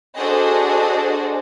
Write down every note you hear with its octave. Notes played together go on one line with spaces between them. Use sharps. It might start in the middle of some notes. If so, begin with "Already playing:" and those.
D4 F#4 G#4 A4 C5 D#5